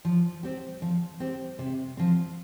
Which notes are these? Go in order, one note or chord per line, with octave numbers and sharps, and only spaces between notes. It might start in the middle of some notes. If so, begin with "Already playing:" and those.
F3
C4 G4
F3
C4 G4
C3
F3 C4